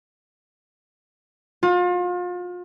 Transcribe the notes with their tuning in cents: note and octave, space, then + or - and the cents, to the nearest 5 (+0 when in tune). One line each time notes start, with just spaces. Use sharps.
F4 +35